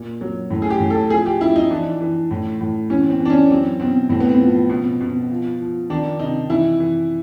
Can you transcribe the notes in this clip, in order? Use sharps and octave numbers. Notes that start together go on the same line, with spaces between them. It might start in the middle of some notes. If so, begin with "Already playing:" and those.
Already playing: A#2
F#3
A2
G#4
G4
A2
A4
F3 G#4
G4
F3 E4
D#4
E3 D4
E3
A2
A2
E3 C#4
C4
E3
D4
C#4
F#3 C4
B2 C4
A2 C4
B3
C4
F3
B2
B2
F3
F3
D#3 D4
C3 D#4
E3 E4
E3